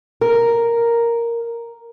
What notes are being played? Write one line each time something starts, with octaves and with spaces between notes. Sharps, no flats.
A#4